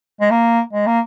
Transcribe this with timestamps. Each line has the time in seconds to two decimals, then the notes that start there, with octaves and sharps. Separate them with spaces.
0.21 G#3
0.31 A#3
0.73 G#3
0.87 A#3